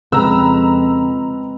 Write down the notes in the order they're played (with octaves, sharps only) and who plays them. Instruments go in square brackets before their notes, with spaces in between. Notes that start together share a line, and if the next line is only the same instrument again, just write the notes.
[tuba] F2 [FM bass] C#3 [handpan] G#3 C4 B4 [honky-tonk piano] A#5 E6